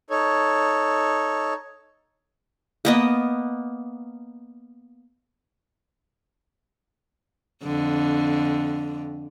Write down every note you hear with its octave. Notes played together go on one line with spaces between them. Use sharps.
D#4 A4 C#5
A#3 B3 D#5
F2 D3